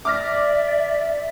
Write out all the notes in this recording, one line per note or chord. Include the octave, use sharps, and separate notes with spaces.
D5 E5 D6 F6 A#6